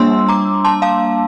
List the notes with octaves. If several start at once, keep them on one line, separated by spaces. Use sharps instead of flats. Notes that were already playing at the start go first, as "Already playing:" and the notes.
Already playing: G3 A#3 D4 C6 E6
A#5 D6
A5 C6
F5 A5